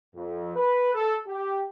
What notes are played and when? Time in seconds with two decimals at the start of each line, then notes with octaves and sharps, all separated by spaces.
0.15 F2
0.56 B4
0.94 A4
1.27 G4